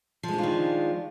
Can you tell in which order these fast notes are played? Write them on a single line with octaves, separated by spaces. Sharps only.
F3 G#3 D4 F4 D#3